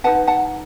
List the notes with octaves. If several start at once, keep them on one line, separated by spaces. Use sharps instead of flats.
D#4 G#4 B4 F#5 A5
F#5 A5